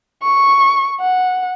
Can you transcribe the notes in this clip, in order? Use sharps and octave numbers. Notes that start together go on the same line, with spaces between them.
C#6
F#5